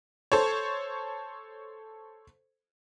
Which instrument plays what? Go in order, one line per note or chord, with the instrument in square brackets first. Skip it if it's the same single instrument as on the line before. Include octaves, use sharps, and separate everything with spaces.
[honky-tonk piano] A4 C5 C#5